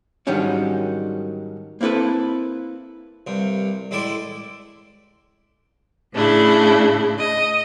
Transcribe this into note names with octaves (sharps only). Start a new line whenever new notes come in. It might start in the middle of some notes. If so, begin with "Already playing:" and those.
G#2 D#3 F#3 G3 C#4 D4
A#3 C4 E4 A4 B4
C2 G2
A2 G#3 E4 A4 D5 C6
A2 C#3 D4 E4
D#5